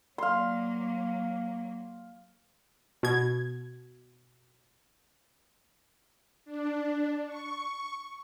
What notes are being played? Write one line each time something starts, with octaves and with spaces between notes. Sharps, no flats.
F#3 A#3 F5 C6
B2 G#6
D4
C#6